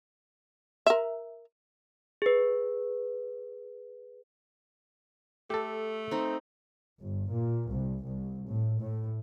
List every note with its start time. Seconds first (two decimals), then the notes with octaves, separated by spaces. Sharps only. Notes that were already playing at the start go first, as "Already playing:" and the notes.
0.86 A#4 E5
2.22 G#4 B4
5.50 A3 G4 A4
6.11 C4 D#4
7.02 G1
7.31 A#2
7.71 C2
8.04 C2
8.50 A2
8.82 A2